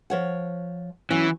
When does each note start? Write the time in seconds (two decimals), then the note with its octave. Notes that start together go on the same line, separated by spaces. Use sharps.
0.10 F3 C#5 F#5
1.11 E3 F#3 C#4 E4